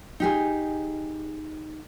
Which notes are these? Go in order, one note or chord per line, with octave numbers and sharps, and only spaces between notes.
D#4 G4 G#4